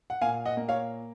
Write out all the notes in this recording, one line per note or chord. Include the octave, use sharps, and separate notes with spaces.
F#5
A#2 F5 G#5
D#5 F#5
A#3
C#5 F5